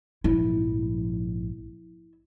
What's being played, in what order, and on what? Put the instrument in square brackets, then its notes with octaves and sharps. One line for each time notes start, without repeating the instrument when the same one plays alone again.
[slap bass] A#1 G#2 F3 [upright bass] E4